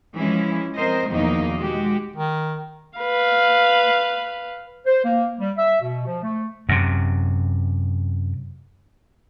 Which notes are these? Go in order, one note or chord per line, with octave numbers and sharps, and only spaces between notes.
E3 F3 G#3 C#4 E4
C4 A#4 C5 D#5
E2 B2 D#3 F3 A#3 D#4
G#3 F#4 G4
D#3
B4 F5
C5
A#3
G3
E5
B2
F3
A3
F#2 C3